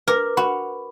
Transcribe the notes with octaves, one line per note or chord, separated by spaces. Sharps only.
A#4 B4 D6
F#4 B5